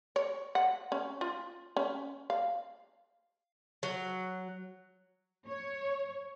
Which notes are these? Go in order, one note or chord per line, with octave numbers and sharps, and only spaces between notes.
C#5
F#5
C#4
F4
C#4
F5
F#3
C#5